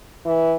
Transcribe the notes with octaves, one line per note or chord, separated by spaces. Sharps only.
E3